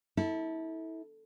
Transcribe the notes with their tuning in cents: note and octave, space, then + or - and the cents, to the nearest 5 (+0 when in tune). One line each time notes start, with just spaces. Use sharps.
E4 -30 A4 +0